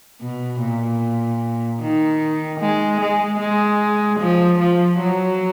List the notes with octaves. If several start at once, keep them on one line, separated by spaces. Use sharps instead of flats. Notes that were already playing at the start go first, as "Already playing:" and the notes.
B2
A#2
D#3
G#3
G#3
G#3
F3
F3
F#3